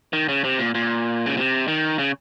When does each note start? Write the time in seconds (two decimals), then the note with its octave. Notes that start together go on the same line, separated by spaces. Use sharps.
0.13 D#3
0.29 C#3
0.44 C3
0.59 A#2
0.75 A#2
1.26 C#3
1.37 C3
1.68 D#3
1.99 C#3